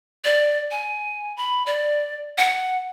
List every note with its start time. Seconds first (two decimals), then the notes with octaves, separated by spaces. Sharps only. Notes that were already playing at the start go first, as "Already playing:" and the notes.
0.24 D5
0.71 G#5
1.37 B5
1.66 D5
2.38 F#5